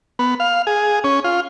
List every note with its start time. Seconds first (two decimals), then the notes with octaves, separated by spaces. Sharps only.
0.19 B3
0.40 F5
0.67 G#4
1.04 C#4
1.24 F4